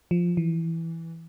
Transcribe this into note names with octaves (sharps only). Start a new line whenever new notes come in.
F3
E3